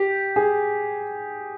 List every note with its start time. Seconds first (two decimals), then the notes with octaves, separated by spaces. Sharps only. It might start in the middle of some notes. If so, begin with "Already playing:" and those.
Already playing: G4
0.36 G#4